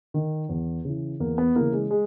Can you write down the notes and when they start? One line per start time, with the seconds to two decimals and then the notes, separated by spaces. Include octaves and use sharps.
0.14 D#3
0.49 E2
0.85 C#3 E3
1.20 E2 A#3
1.38 B3
1.55 C#3 E3 A#3
1.73 G#3
1.91 G#3